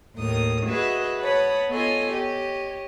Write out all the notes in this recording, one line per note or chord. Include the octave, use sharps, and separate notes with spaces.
D#2 A2 A#4 D#6
F#4 G#4 B4 D#5 E5
B4 C#5 F#5 A5 B5 D#6
B3 F4 A4 C#5 D#5 G#5
G4 C#5 D#5